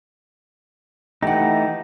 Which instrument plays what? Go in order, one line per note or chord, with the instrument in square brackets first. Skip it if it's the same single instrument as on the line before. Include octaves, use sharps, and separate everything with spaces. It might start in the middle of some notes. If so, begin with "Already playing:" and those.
[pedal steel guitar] E3 A3 D#4 [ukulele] G4 F#5